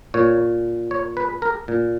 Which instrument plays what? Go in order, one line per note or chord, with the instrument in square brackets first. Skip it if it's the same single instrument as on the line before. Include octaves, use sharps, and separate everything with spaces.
[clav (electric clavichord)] A#2 C#5
C#5
B4
A#4
A#2